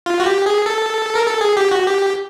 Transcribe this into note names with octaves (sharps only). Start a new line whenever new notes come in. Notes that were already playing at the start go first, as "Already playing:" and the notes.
F4
F#4
G4
G#4
A4
A#4
A4
G#4
G4
F#4
G4